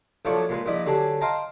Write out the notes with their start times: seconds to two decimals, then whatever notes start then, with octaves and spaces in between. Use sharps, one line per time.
0.25 A#1 F3 F#3 A3 C#5 D5
0.49 A#2 G#3 B4
0.66 A#1 E4 D5 D#5 B5 D#6
0.86 D3 F#3 G4 G#4 A5
1.21 C5 D#5 F5 G5 A5 A#5